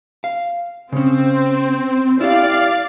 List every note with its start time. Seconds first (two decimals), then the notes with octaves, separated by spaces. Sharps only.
0.24 F5
0.92 C#3 C4 C#4
2.21 E4 G4 D5 F5